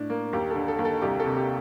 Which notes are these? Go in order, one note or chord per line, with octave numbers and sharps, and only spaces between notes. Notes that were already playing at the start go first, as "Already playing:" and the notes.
Already playing: A2 D4
A#3
D#2 G4
D3 A4
A4
D#2
A4
C2 G4
A4
C3
G4